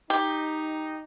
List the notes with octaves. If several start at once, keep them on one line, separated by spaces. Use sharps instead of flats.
D#4 G4